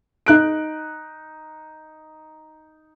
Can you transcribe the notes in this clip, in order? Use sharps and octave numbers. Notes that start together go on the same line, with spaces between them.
D#4 F#6 D7